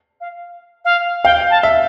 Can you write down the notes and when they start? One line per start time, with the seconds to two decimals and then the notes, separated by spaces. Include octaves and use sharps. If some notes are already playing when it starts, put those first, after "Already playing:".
0.21 F5
0.85 F5
1.24 F5 G5
1.50 A5
1.63 E5